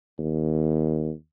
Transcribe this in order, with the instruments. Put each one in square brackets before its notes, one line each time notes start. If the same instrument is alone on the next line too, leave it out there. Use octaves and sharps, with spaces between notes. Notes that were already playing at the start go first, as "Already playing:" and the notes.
[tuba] D#2